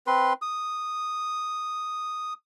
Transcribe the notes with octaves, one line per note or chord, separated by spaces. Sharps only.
C4 B4 C6
D#6